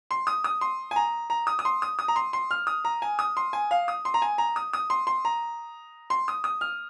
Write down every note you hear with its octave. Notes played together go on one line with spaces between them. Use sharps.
C6
D#6
D#6
C6
G#5
A#5
A#5
D#6
D#6
C6
D#6
D#6
A#5
C6
C6
F6
D#6
A#5
G#5
D#6
C6
G#5
F5
D#6
C6
A#5
G#5
A#5
D#6
D#6
C6
C6
A#5
C6
D#6
D#6
F6